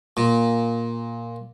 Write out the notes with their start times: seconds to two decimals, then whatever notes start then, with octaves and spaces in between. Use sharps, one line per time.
0.17 A#2